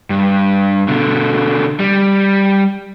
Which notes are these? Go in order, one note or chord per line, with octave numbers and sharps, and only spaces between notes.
G2
B2 D3
G3